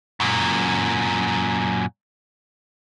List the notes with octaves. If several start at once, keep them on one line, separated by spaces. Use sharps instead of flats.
F#2 A#2